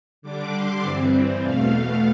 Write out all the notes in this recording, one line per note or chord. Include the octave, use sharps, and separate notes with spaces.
D3 G3 D4 D6
C6
G2 E3 G3 C4
E2 B2 A3 F5